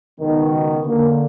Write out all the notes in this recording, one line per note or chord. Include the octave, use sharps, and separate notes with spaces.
C#2 B2 D#3
D3 A#3